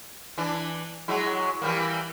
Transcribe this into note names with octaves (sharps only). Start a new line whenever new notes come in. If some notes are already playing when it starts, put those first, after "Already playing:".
E3 D4
F#3 G#3 E4
E3 G3 A#3